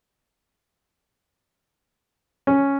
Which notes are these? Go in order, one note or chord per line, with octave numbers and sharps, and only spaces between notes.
C#4